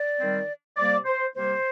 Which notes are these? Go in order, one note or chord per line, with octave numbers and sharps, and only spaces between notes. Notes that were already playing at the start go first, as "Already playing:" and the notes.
Already playing: D5
D#3 G3 C4
C3 G3 A#3 D5
C5
C3 G3 A#3 C5